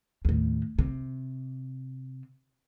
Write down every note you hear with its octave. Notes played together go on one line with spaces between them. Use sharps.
D#2 A2
C3